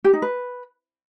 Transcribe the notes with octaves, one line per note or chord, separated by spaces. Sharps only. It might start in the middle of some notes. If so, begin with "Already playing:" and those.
G4
D#4
B4